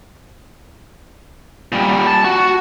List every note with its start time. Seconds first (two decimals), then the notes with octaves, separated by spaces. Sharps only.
1.72 A#2 G3
2.07 A5
2.25 F#4